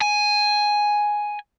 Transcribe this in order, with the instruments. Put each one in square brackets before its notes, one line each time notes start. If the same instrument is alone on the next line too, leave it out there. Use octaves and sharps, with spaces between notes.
[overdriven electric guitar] G#5